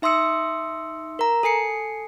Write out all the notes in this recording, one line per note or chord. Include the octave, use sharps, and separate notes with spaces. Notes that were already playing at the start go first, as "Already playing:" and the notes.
D#4 E5 C6 D#6 E6 C#7
A#4 A#5
A4 G#5 C7 C#7